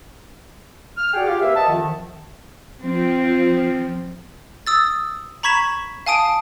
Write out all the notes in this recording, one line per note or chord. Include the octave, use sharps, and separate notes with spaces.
F6
F#4 G#4 D5 F#5 G5
F4 G4 F5
C3 A#3 B4 E5
D#5 E5 F#5 A5
F2 D#3 F3
F3 C4
D#6 E6 A6
A#5 B5 C#6 G#6 B6 E7
F5 G#5 A5 D#6 D7 D#7